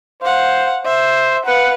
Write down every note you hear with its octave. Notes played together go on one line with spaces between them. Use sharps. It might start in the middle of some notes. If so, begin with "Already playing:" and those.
C5 F5 F#5
C5 E5
B4 F5 F#5